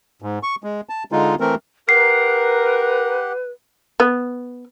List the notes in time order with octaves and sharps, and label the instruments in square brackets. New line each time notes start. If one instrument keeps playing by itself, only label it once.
[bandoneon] G#2
C#6
G#3
A5
D3 G#3 D#4 F4
E3 A3 C4 A#4
[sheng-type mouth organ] G4 F#5 [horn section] A#4 [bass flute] B4 [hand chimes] C7
[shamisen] B3